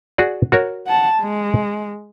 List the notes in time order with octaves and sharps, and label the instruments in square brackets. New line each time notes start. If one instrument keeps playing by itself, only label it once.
[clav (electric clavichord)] F#4 G#4 D5
F#4 A#4 C#5
[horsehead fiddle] F#5 A5
G#3